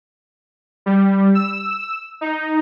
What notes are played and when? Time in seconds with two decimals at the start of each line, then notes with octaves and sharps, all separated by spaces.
0.86 G3
1.35 E6
2.21 D#4